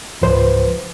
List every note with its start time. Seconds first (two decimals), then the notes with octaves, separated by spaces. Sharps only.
0.22 C#2 G#2 F3 B4 C5